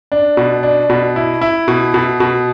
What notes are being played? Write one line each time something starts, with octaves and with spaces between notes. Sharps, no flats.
D4
B2
D4
B2
E4
E4
B2
B2
B2